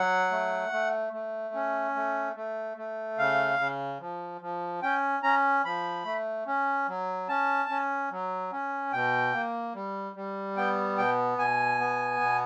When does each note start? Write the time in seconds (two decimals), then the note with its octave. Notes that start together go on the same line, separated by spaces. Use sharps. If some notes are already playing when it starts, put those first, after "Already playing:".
Already playing: F#3 F#5
0.31 A3
0.73 A3
1.13 A3
1.54 C#4
1.96 A3
2.36 A3
2.77 A3
3.18 C#3 F5
3.59 C#3
4.00 F3
4.41 F3
4.83 C#4 G5
5.23 C#4 A#5
5.65 F3 B5
6.05 A3
6.47 C#4
6.88 F#3
7.28 C#4 A5
7.69 C#4
8.11 F#3
8.52 C#4
8.93 B2 G5
9.33 A#3
9.75 G3
10.16 G3
10.57 B3 G5
10.98 B2 G5
11.38 B2 G#5
11.80 B3
12.21 B2